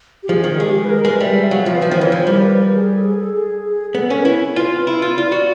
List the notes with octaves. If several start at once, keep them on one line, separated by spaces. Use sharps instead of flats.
G4
F3 G#4
D#3
G#3 G4
G#4
B4
A#4
G#3 B4
G3 E5
F#3 F5
F3
B4
F3 C5
D#3
E3 C#5
F3 C5
G3
A#4
B4
A#4
G#4
A4
G#4
A4
G#4
G#4
B3 A4
C#4 A#4
E4 B4
F4
E4
F4
F4 D5
F#4 D5